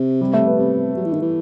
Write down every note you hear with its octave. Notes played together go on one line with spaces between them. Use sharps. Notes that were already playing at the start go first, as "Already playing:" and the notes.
Already playing: C3
G3
A3
B3
C3
F#3
E3
D#3
E3